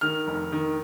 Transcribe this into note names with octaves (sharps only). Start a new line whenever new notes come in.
D#3 F6
F1
D#3